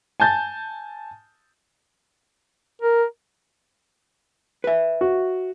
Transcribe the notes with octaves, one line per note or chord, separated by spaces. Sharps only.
G#5 A5 G6 A6
A#4
B4 E5
F#4